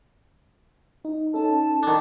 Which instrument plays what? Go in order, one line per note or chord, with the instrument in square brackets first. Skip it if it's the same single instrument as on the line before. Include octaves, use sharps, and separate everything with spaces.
[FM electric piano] D#4
[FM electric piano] C#4 D#4 A4 [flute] A5
[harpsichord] D#3 D4